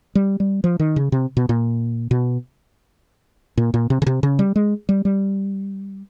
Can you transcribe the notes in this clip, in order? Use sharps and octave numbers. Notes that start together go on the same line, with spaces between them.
G3
G3
F3
D#3
C#3
C3
B2
A#2
B2
A#2
A#2
C3
C#3
C3
C#3
G3
G#3
G3
G3